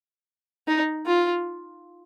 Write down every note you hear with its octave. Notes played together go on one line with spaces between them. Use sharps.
D#4
F4